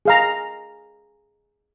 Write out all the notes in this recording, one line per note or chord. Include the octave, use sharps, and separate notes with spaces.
G#4 F5 A#5